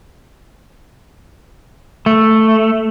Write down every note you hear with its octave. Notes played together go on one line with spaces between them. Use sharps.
A3